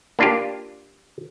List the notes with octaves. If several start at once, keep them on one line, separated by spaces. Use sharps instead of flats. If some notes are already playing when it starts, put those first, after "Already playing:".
A#3 D4 F4 G4